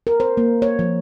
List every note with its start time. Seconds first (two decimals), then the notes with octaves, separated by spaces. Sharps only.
0.07 A#4
0.20 C5
0.37 A#3
0.62 C#5
0.79 F3